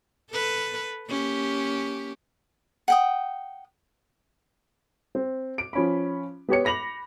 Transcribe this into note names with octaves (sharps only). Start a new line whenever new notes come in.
A4 B4
A#3 C#4 G4
F#5 G5 D#6
C4
D7
F3 C#4 B5
B3 G4 C#5 C#7
B5 A#6 F7 F#7